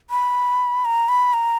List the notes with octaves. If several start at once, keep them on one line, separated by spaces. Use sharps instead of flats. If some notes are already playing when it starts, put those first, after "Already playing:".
B5
A#5
B5
A#5